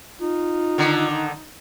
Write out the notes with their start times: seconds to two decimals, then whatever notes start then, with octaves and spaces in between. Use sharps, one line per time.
0.20 D#4 F4
0.78 D3 D#3